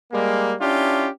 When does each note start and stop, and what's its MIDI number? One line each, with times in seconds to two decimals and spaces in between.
0.12 0.54 55
0.12 0.54 56
0.12 0.54 58
0.60 1.07 61
0.60 1.07 62
0.60 1.07 64
0.60 1.07 65
0.60 1.07 67